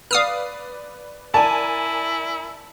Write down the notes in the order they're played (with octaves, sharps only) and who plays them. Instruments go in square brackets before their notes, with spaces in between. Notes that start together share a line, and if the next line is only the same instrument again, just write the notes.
[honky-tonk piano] B4 D5 [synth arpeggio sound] F5 D#6 F6
[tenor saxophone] E4 [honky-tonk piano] A#4 D5 G#5 [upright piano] A5